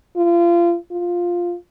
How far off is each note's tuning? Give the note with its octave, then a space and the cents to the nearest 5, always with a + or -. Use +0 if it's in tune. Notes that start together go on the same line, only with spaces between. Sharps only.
F4 -30
F4 +5